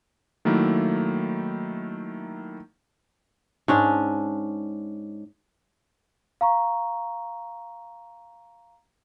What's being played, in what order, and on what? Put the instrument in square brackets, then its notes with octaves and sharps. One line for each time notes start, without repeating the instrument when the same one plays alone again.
[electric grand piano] D#3 F#3 A3 A#3 E4
[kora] G#2 C#4 D4
[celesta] F5 A#5 C#6